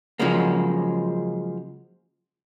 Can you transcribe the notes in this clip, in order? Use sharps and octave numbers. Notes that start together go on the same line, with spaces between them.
C#3 F3 F#3 G#3 A#3